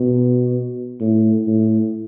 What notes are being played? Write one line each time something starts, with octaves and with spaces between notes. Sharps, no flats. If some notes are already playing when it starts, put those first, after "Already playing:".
Already playing: B2
A2
A2